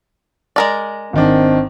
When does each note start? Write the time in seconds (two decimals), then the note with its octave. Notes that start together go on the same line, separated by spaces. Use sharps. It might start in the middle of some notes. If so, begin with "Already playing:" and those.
0.56 G#3 A#4 D5
1.13 G#1 D#3 C4 D4